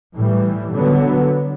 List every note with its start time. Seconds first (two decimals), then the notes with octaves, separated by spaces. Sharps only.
0.16 A2 E3 G3
0.73 D3 F#3 B3